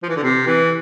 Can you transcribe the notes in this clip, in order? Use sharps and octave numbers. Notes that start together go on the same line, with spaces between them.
F3
E3
D3
C3
E3